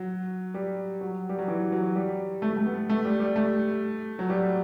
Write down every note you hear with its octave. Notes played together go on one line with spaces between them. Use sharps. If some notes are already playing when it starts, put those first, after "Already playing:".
Already playing: F#3
G3
F#3
G3
F#3
E3
F#3
G3
A3
A3
B3
A3
G3
G3
A3
F#3
G3